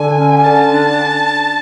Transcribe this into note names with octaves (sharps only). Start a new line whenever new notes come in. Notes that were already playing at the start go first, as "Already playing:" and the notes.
Already playing: D3 G#5
C#4
D3 A5
D4